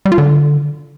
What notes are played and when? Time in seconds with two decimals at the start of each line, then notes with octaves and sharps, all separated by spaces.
0.05 G3
0.12 F4
0.18 D3